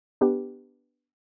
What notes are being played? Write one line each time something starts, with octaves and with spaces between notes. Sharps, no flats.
B3 D4 G4 B4